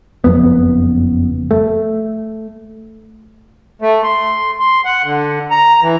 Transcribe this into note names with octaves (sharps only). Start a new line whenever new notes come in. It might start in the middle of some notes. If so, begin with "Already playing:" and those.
F#1 F2 B3
A3
A3
C6
C6
F#5
D3
A#5
E3